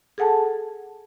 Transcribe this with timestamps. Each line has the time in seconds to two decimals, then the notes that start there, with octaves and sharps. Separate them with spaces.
0.18 G#4 A4 F#5 G#5 A5